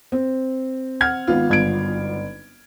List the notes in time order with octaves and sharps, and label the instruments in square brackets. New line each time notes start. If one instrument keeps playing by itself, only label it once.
[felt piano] C4
[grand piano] F#5 F6 G#6
G#1 B3 F4
[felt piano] G1 G#6 D7